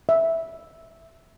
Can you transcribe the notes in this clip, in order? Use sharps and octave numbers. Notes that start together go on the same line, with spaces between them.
E5